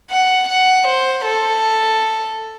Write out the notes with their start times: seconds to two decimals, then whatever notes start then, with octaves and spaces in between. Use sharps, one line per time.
0.11 F#5
0.49 F#5
0.87 C5
1.25 A4